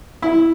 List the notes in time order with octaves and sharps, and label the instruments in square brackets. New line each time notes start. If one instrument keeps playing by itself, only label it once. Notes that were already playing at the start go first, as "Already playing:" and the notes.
[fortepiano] E4